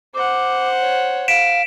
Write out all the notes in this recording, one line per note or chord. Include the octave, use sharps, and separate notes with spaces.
C5 F#5 D6
C#5
F5 B6 D7 E7